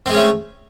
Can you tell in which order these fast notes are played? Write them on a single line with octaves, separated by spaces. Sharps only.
C4 G#3 C#4 A3